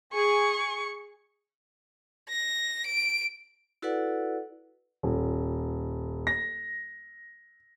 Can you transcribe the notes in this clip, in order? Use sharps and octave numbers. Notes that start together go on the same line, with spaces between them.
G#4 C#6
A#6
D7
E4 F#4 A4 B4 D5 F#5
D#1
A#6